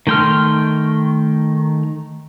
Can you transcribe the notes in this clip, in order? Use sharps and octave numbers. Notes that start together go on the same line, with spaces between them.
D#3 A3 G5 C6 F6